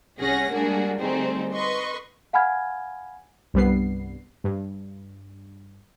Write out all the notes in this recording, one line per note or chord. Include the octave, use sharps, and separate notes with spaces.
C2 C#4 G#4 F#5 A#6
G3 G#3 A#3 D4 F#4 G#4
D3 G3 A3 C4 D#4 G#4
B4 D#5 C6 C#6
F5 F#5 G#5 B5 F6 G#6
C2 G2 G3 B3 C7
G2